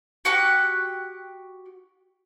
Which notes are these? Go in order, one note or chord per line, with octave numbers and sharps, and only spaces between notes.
F#4 G4 C#6 F#6